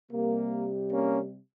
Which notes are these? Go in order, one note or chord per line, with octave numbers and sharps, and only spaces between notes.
C3 G3 A#3
A#3 C#4